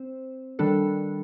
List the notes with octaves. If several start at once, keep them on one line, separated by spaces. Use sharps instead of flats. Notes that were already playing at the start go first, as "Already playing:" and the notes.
Already playing: C4 C5
D#3 G3 D4 A4